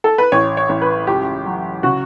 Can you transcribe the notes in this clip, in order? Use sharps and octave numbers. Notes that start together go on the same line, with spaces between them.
A4
B4
A1 C#5
C#5
A1
B4
C#2 G4
F#3
C#3 F#4